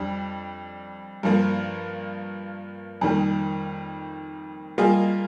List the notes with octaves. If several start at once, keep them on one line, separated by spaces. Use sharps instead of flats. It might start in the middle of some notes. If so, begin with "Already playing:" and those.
Already playing: F2 G3 D4
G2 F3 A#3 F4
F2 D#3 G3 A#3
G3 A#3 F4 G#4 D#5